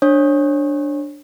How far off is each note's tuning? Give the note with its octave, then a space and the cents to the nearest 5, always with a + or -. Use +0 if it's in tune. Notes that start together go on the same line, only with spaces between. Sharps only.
D4 +0 C#5 -30